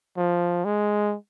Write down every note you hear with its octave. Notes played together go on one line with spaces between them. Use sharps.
F3
G#3